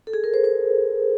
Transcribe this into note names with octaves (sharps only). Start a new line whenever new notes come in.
A4
G#4
A#4
C5
C5